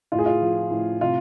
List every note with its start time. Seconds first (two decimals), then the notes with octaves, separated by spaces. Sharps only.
0.12 A2 F4
0.19 G#4
0.26 F4
0.42 F3
0.71 A2
1.01 C3 F4